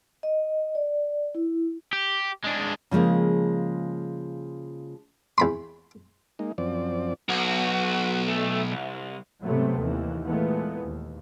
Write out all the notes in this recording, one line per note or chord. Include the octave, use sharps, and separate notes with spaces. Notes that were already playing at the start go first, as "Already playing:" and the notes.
D#5
D5
E4
G4
G#3 D4
C#3 F3 G#3 A#3
E2 B5 C6
G#3 A#3 D#4
F#2 F3 C4 D5
B1 F#4
A3
C2
G#2 C3 F#3 A3 B3 C4
D#2 E3
A#2 E3 G#3 A3 B3
D#2